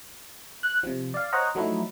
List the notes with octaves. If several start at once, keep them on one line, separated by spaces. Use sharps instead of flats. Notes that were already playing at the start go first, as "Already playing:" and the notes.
F#6
C3 F3
D5 F5
C5 C#5 D#5 F#5 A#5
F3 F#3 A3 D#4 E4